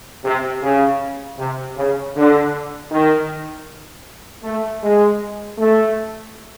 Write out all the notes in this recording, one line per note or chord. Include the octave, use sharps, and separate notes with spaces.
C3
C#3
C3
C#3
D3
D#3
A3
G#3
A3